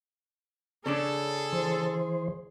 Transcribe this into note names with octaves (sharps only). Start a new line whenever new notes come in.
C#3 C#4 D4 G#4 A4
E3 C5